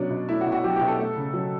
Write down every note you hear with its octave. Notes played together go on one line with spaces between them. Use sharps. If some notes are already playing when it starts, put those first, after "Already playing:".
Already playing: B2 F#3 C#4 D4
B2
A3 E4
F#4
B2
F#4
F#3 G4
G4
B2
A4
A3
C#3
F#3